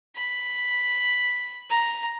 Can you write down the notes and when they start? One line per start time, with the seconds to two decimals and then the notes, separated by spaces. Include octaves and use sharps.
0.16 B5
1.70 A#5